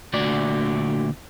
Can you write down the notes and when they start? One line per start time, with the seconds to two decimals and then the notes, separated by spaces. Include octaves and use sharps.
0.13 A#2 D3 A3 D4 F#4 D5